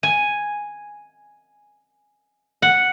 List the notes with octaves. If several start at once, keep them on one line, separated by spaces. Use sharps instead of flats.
G#5
F#5